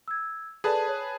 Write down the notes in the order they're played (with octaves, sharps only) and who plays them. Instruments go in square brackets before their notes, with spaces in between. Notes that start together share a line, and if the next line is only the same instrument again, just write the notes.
[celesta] E6 G#6
[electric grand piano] G#4 B4 A5 [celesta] A4 D5
[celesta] C#5